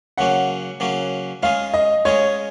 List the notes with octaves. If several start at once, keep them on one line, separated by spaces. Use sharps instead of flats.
C#3 F#3 A#3 C#4 F#5
C#3 F#3 A#3 C#4
G#3 C#4 F4 G#4 F5
D#5
G#3 C#4 F4 G#4 C#5